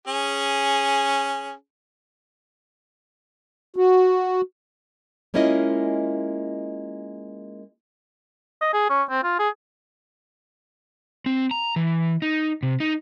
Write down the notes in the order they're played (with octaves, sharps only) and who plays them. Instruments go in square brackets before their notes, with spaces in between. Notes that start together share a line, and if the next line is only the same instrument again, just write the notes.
[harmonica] C#4 G#4
[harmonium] F#4
[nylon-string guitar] G#3 A#3 C#4 E4 F4 D#5
[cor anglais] D#5
G#4
C#4
C4
F4
G#4
[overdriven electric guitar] C4
A#5
E3
D#4
C3
D#4